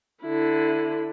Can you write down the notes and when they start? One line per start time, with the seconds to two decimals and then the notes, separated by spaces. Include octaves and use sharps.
0.23 D3 E4